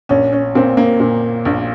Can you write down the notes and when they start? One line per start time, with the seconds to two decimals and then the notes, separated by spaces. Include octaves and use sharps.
0.09 A#1 C#4
0.33 C#4
0.55 A#2 C4
0.77 A#3
1.00 A#2
1.45 A#1